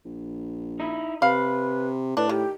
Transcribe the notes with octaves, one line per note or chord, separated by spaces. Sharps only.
A#1
D#4 E4
C3 B4 F5 B5
A2 D4 B4
D#3 G4